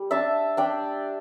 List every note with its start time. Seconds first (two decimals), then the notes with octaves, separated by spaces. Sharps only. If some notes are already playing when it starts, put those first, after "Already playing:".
Already playing: G3
0.11 D4 E5 A5
0.57 D4 D5 G5